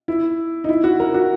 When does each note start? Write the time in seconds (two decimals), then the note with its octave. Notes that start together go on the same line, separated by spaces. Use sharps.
0.08 E4
0.64 D#4
0.69 E4
0.84 F#4
1.00 A#4
1.14 F#4